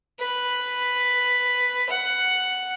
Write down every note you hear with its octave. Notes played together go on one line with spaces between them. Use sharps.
B4
F#5